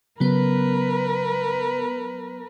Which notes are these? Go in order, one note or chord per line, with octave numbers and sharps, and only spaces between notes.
C#3 F#3 B3 A#4 B4